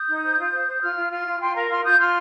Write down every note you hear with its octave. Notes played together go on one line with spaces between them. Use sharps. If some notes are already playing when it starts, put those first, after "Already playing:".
Already playing: D#6 G6
D#4
C5
F4
C5
C5
F4 C6 F6
F4
F4 C6 F6
F4
F4 G5 C6
A#4 F5 A#5
F4 C6 F6
F4 D#6 G6
F4 C6 F6